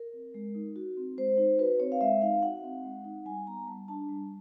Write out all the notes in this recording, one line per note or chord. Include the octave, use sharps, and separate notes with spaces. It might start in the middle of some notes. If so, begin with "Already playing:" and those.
Already playing: A#4
C4
G#3
D#4
F#4
C4
G#3 C5
D#4
F#4 B4
C4 C#5
F5
G#3 E5
D#4 F5
F#4 F#5
C4
G#3
D#4
G3 G#5
B3 A#5
G3 A5
D4 A5
G3